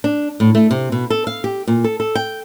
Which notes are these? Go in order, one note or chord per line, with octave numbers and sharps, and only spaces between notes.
D4
A2
A3
C3
B2
A4
F5
G4
A#2
A4
A4
G5